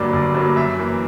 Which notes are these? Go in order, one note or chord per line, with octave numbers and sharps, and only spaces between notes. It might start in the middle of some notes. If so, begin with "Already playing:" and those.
Already playing: G1 G2 F#3 A#3 D5
G1
G2 F#3 A#3
F#2 E5
E3 A#3